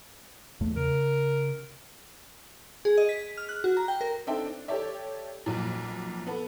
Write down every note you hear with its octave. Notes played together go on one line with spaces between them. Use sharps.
E2 A3
C#3 A#4
G#4
D#5
B6
F6
F#6
F#4
A#5
G5
A#4
C4 D4 D#4 A4 E5 G5
D4
G4 A4 C#5 D5 E5
B1 F2 A#2
B3 A4